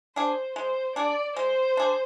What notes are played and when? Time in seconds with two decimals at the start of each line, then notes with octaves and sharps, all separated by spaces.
0.16 D4 G#4 C5
0.56 G#3 C5
0.96 D4 G#4 D5
1.36 G#3 C5
1.77 D4 G#4